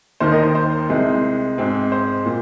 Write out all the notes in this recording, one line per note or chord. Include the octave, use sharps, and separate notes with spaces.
D#2 D#3 A#3 C5
A#4 D#5
C5
C2 C3 G#3 C4
G#2 G#3 C4
C5
A#2